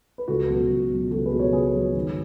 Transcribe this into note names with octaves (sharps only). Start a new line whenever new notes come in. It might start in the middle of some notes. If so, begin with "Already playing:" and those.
B4
C#2 F#4 A4
B2 F#3
C#2
B2 F#3
C#2 F#4 A4
G#4 B4
B2 F#3
A4 C#5
C#2 G#4 B4
B2 F#3
G#1